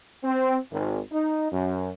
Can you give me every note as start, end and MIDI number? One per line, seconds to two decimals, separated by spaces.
0.24 0.56 60
0.71 0.99 32
1.13 1.50 63
1.52 1.89 42